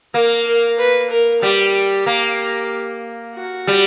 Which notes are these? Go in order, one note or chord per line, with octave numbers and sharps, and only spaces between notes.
A#3 A#4
A#4
B4
A#4
G3 G4
A#3
F#4
G3